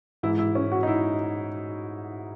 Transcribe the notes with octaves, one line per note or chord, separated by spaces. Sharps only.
G#2 E3 E4
E4
C#4
F#4
D#4
E4